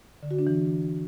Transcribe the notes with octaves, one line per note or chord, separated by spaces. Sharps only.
D3
F#4
D4
E3